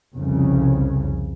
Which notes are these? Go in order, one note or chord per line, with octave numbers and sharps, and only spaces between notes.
C2 F2 C#3